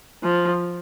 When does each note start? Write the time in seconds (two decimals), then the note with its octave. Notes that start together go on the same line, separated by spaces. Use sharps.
0.23 F3